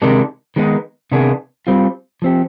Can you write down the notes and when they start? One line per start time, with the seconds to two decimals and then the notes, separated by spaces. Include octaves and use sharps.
0.02 C3 D#3 G#3 D4
0.56 D#3 G#3 B3 D#4
1.12 C3 D#3 B3 D4 G#4
1.67 G3 C4 F4
2.22 F3 C4 G4